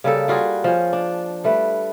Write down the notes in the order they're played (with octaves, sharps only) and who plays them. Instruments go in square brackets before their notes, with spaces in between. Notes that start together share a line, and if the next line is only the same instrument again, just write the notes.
[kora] C#3 G3 A#3 A4
G3 F4 F#4 G#4
F3 C#4
D4
G3 A3 B4